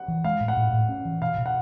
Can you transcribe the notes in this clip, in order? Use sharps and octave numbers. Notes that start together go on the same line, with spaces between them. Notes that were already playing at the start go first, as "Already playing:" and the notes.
Already playing: F#5
E3
G#3 F5
A2
F#5
A2
A2
C#4
E3
B2 F5
B2
F#5